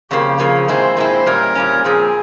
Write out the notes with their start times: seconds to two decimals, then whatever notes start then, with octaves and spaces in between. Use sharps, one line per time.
0.11 F2 C#3 F3 A#3 G4
0.39 F2 C#3 F3 A#3 G#4
0.68 A#2 G#3 C4 E4 C5
0.97 A#2 G#3 C4 E4 C5
1.26 A#2 G3 C#4 A#4
1.55 A#2 G3 C#4
1.84 A#2 F3 C4 G#4